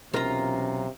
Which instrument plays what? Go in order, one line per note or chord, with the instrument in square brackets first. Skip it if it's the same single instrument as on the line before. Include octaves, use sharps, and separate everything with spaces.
[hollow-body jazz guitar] B1 A#4 [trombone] C3 [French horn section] E3 F#3 C#4 [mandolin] F4 A#5